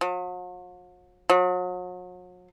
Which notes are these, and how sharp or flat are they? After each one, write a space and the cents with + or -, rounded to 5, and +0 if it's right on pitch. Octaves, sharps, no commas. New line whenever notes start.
F#3 -45
F#3 -40